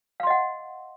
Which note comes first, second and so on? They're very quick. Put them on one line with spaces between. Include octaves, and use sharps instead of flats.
F5 C6 D#5 F#5